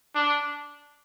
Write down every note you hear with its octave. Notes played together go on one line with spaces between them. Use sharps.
D4